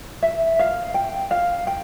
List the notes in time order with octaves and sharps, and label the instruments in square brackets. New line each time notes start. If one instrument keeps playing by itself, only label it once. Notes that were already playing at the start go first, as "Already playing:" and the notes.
[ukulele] E5
F5
G5
F5
G5